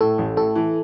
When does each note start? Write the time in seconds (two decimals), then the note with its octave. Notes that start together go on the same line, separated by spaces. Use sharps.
0.01 A2 A4
0.18 A1
0.37 A2 A4
0.56 E3